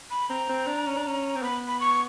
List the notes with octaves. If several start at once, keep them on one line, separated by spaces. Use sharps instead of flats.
B5
C4 A#5
C4
D4
C#4
D4
C#4
C4
B3 B5
B5
C#6